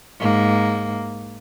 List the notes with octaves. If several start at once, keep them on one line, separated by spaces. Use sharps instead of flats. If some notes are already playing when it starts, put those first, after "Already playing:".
G#2 A#3